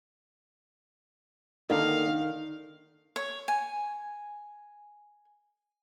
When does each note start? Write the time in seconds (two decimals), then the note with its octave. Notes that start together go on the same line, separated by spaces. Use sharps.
1.70 D3 D#3 A#3 D#4 F5
3.16 C#5
3.48 G#5